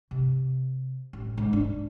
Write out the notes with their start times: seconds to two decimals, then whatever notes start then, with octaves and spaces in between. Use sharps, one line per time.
0.11 C3
1.13 A1
1.37 G#2
1.53 D4